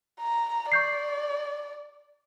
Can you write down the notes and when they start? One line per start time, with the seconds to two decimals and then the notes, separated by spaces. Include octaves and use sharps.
0.21 A#5
0.72 D5 C#6 G6 C7